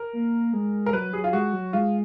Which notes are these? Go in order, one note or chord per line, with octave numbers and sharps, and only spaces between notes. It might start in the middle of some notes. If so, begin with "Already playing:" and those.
Already playing: A#4
A#3
G#3
A#4
F#3 B4
F#3 G#4
F4
G#3 F#4
F#3
G#3 F4